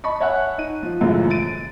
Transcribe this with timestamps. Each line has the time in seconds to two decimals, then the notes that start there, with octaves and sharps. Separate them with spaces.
0.04 D#5 A5 B5 C#6
0.20 C#5 E5 F#5 G#5 F#6
0.58 D#4 D#7
0.83 F3
1.01 F#2 A2 C#3 E3 F3 G#3
1.30 A6 D7 D#7